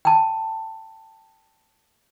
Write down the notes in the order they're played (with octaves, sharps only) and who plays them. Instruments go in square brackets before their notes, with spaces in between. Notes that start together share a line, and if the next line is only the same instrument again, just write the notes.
[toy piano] G5 A5